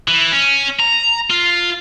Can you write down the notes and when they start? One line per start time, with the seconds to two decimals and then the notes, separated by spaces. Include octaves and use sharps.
0.08 E3
0.32 C#4
0.80 A#5
1.31 F4